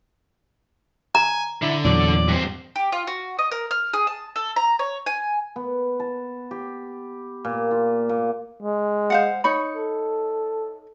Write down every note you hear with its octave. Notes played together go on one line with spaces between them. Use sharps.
G#5 A#5
D3 E4
E2 A#2 F#3 D5
G2 C4
G4
F4
F#4
D#5
A#4
F6
G#4
A5
A4
A#5
C#5
G#5
B3
A5
G4
A#2
F4
A#2
G#3
C5 F5 F#5
D#4 C#5 B5
A4